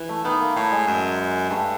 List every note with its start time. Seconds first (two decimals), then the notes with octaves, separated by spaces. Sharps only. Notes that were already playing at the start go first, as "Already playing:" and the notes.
Already playing: E3
0.09 A3
0.24 D#3 B3
0.41 A#3
0.56 A2 A3
0.72 G#3
0.87 F#2
1.50 G2 A3